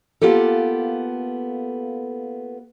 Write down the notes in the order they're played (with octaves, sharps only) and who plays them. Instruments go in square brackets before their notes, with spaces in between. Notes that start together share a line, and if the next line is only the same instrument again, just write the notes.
[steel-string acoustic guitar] A#3 B3 F4 G4 A4